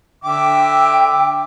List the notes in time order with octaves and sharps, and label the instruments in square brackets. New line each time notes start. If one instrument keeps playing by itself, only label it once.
[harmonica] D3 E5 D6 [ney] G5